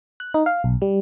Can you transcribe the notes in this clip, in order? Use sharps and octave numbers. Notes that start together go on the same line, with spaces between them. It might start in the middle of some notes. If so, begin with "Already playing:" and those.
F#6
D#4
F5
B1
G3